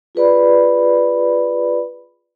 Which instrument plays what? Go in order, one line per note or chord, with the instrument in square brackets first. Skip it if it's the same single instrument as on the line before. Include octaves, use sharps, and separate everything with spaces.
[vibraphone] F4 G#4 B4 D5 B5